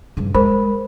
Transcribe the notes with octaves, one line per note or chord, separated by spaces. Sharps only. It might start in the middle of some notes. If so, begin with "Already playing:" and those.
G2 C#3
G#3 A#4 C5 B5